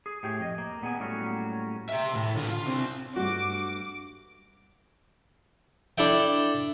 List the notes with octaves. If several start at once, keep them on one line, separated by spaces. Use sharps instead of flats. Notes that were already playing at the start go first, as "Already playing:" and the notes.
G#4
A2 G4 G#4
F2 D#5
A#3
A#2 B3 G#4 G#5
A2 F#3 G3 A#3 C#4 F#4
G4 E5
A2
D3 F4
F4
C2 C4
G2 G3 A3 F#4 D6
D4 E4 A4 E5 G5